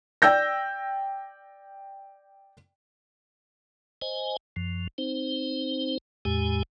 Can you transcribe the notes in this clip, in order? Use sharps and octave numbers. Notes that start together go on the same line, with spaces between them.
D5 G5 E6 G6 A#6
C5 D#5 G#5
F#2 F3
C4 D#4 C5
E2 A2 G#3 G4 G#5